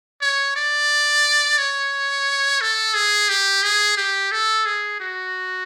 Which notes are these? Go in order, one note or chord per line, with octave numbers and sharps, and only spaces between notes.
C#5
D5
C#5
A4
G#4
G4
G#4
G4
A4
G#4
F#4